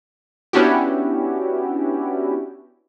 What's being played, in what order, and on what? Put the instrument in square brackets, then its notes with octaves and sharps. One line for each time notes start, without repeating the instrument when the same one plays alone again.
[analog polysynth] B3 C#4 D4 E4 F#4 G4